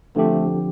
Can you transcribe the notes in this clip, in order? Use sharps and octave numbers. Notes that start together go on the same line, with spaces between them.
D3 F3 A3 C4 G4